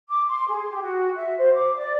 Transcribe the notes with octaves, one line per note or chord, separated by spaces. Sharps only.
D6
C6
G#4
G4
F#4
E5
C5
D6
D5